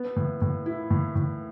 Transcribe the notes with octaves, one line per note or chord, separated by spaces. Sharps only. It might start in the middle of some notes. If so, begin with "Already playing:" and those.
Already playing: B3
A2
A2
E4
A2
A2